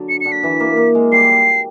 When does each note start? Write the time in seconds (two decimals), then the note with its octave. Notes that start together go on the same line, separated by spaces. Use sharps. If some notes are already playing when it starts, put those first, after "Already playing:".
Already playing: D3 F#3
0.09 C#7
0.21 C#7
0.26 D3
0.32 B6
0.43 E3
0.60 A#3
0.77 A#3
0.95 G#3
1.12 G3 C7